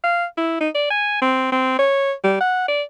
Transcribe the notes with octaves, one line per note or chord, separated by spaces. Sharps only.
F5
E4
D#4
D5
G#5
C4
C4
C#5
G3
F#5
D5